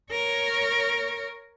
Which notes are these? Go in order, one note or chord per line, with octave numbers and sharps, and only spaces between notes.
A#4 C#5